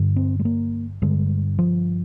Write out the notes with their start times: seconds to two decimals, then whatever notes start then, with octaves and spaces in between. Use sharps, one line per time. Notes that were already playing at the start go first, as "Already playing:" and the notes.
Already playing: G2 D3
0.16 C4
0.39 G#3
0.45 A#3
1.02 G2 D3 G#3
1.59 F3